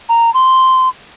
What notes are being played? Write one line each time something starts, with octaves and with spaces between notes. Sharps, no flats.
A#5
C6